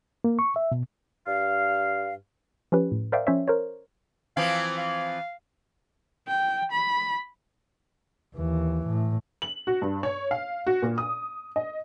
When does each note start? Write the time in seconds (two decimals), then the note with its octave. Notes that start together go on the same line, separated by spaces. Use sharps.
0.24 A#3
0.39 C#6
0.56 E5
0.72 B2
1.27 G2 F5
2.72 F3 C#4 G4 B4
2.92 A2
3.12 A#4 C5 D5 E5 F5 G5
3.27 F3 C#4 C5 C#5 E5
3.48 A#4 C5 C#5
4.37 E3 F3 C4 F5
4.78 F5
6.28 G5
6.72 B5
8.35 D#2 E3
8.86 A2
9.42 F#7
9.67 F#4
9.82 G2
10.03 C#5
10.31 F5
10.67 F#4
10.82 A#2
10.98 D#6
11.56 D#5